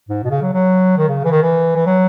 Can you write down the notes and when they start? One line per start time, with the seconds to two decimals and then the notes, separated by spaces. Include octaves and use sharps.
0.09 G#2
0.24 B2
0.30 C#3
0.42 F#3
0.53 F#3
0.98 D#3
1.08 C#3
1.25 E3
1.31 D#3
1.42 E3
1.76 E3
1.87 F#3